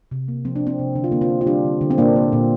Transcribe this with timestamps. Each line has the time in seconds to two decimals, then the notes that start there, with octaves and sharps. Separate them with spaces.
0.11 C3
0.28 A#3
0.45 F3 C4
0.56 D4
0.62 C3 C4
0.79 C3
0.96 D3 D4
1.04 F4
1.12 D3 A#3 D4
1.21 C4 F4
1.30 A#3
1.41 F4
1.47 G3 D4 G4
1.65 D3
1.81 D3
1.91 C4
1.98 A#2 A#3 D4
2.16 A#3
2.32 A#2